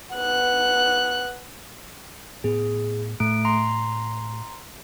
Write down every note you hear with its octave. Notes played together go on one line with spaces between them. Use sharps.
B3 F#6
A2 B3 G#4
A2 A3 D7
A#5 C6